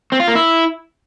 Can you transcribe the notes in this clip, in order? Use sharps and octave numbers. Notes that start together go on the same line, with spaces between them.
C4
F4
A#3
E4